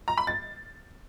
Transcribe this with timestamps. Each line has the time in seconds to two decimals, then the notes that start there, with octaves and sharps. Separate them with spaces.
0.08 A#5
0.18 B5
0.27 A6